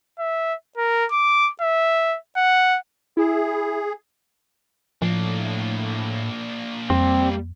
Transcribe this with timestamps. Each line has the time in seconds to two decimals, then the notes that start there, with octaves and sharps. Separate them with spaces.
0.19 E5
0.77 A#4
1.11 D6
1.61 E5
2.37 F#5
3.17 E4 G#4
5.02 A2 F3 A#3 D4
6.90 F2 G3 C4